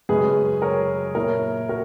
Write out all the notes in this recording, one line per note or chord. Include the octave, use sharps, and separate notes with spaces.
F#2 C#3 G#3 C#4 G#4 B4
A#4 C#5
A#2 A#3 E4 A#4 C#5
F#4 A#4